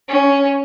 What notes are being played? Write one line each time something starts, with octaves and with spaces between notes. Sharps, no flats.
C#4